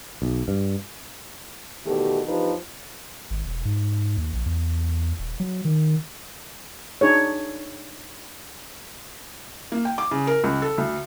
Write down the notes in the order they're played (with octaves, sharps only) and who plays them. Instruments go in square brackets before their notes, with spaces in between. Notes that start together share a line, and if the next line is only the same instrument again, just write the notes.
[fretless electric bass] B1
G2
[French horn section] E2 B2 D#3 A3 G4
E2 F3 D4 D#4 G4 B4
[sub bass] G#1
E1
G#2
D#2
A#1
E2
D#1
F#3
D#3
[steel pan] D4 D#4 G#4 C#5
[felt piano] A#3
G5
D6
C#3
A#4
C#2
A4
D2